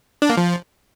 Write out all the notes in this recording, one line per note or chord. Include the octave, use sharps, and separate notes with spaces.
D4
A#3
F3